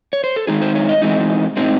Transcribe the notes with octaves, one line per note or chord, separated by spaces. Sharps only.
C#5
C5
A4
D#3 G#3 D#4 G#4
C5
C#5
D#5
E3 G#3 C4 D#4
A2 G#3 C4 D#4